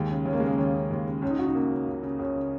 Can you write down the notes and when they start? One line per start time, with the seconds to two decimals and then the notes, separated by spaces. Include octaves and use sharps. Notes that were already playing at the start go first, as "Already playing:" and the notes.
Already playing: D#2 G#3
0.10 C#3
0.25 D#2 C#4
0.33 A#3
0.40 C#3 G#3
0.47 A#3
0.58 D#2 C#4
0.74 C#3
0.91 D#2
1.07 C#3
1.22 C#2 C#4
1.31 D#4
1.39 C#3 F#4
1.46 D#4
1.55 C#2 A#3
1.71 C#3
1.87 C#2
2.03 C#3
2.19 C#2 C#4
2.36 C#3